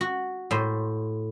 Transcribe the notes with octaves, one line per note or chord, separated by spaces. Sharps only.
F#4
A2 C5